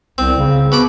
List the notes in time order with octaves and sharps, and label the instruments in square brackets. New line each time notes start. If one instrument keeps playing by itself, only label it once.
[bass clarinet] C2 [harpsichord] C4
[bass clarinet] C#3
[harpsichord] B2 B5 D6